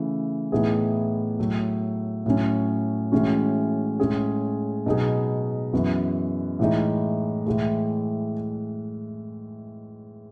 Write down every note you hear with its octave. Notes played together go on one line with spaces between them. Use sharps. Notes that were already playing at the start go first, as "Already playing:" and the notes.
Already playing: C#3 E3 A3
A2 E3 B3 D#4 G#4
A2 F#3 A3
A2 F#3 C#4
A2 E3 G#3 C#4 F#4
A2 G#3 C#4 G#4
B2 F#3 B3 D#4 G#4
F#2 E3 B3 F#4
A2 E3 G#3 D#4
A2 E3 G#3